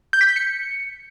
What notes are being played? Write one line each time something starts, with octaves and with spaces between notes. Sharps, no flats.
G6
B6
G6
C#7